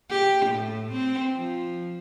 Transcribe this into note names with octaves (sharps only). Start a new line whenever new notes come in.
G4
A2
C4
F3